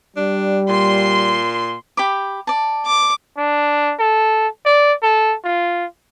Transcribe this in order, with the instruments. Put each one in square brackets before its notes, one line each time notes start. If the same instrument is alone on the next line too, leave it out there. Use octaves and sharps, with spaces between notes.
[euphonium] G3 [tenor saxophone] D4
[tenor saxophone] A#2 [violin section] C6
[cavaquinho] G4 B5 D6
D5 A5
[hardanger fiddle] D6
[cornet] D4
A4
D5
A4
F4